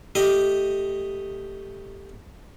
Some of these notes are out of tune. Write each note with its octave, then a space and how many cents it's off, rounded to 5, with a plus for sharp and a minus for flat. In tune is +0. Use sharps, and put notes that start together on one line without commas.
A3 +0 G4 +0 D#5 +0